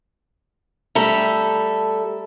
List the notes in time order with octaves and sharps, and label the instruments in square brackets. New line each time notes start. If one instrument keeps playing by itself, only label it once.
[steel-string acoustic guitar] G3 A3 A4 [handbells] E5 A#5 B5